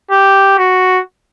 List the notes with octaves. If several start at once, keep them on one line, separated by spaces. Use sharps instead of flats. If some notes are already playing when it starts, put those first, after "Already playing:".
G4
F#4